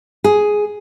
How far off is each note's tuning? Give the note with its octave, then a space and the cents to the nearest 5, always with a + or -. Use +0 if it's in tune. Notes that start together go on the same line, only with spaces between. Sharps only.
G#4 +5